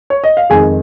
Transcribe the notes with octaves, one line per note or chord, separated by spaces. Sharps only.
C#5
D#5
F5
F2 D#3 G#3 G#4 G#5